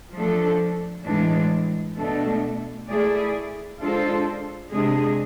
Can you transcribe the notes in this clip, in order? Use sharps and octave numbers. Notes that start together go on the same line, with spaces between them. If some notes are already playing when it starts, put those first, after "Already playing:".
F3 A3 D4 A4
A2 E3 G#3 D4
B2 A3 D4 A4
A3 E4 G#4 D5
G#3 D4 F4 A4 C5
C3 G#3 D4 G#4